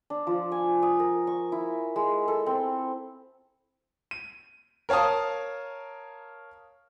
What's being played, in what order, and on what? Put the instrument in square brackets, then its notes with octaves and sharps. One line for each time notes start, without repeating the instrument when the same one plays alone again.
[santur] D4
F3
G#5
D#6
A#4
C#6
E4
G#3
A4
C4
[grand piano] D#7
A#4 C#5 F5 A5 D#6